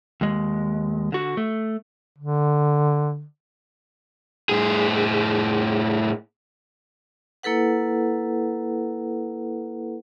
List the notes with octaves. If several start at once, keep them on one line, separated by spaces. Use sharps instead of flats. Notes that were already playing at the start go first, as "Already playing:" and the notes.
D#2 G#3
D3 F#4
A3
D3
A2 G#4
A#3 E4 A4 B4 F#5